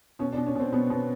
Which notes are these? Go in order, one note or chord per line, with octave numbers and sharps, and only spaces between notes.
B2 C#4
D4
B2
C#4
B2 C4
B2 B3
B2 B3